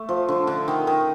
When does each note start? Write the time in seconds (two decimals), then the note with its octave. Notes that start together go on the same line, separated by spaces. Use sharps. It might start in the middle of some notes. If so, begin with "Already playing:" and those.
Already playing: A3
0.09 F3
0.28 D3
0.47 D3
0.68 D#3
0.87 D#3